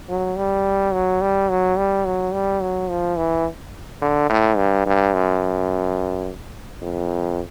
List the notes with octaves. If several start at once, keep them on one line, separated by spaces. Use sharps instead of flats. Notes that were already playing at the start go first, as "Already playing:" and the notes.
F#3
G3
F#3
G3
F#3
G3
F#3
G3
F#3
F3
E3
D3
A2
G2
G2
F#2
F2